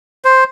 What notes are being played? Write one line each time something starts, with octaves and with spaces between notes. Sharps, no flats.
C5